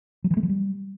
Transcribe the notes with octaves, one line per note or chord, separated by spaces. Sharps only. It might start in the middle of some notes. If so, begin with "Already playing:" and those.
F#3
E3
A3
F3
G3